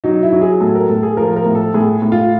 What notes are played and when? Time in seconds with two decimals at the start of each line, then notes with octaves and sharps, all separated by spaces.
0.04 F#3 D#4
0.23 E4
0.32 F#3
0.41 G#4
0.60 A2 A4
0.75 A#4
0.89 A2 A4
1.03 G#4
1.17 F3 A#4
1.36 A#4
1.46 A2
1.55 A4
1.74 A2 G#4
2.02 A2
2.12 F4